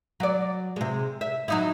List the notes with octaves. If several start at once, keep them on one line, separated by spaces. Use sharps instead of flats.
F#3 D5
C3 G#3
E5
F#3 D#4 E4